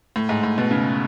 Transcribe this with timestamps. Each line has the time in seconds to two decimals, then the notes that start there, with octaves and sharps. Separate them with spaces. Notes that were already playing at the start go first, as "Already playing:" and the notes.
0.16 A2
0.29 G#2
0.43 A2
0.58 B2
0.71 C#3